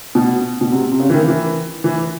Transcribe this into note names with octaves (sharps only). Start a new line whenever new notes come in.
B2
B2
C3
C3
C#3
E3
D#3
E3
E3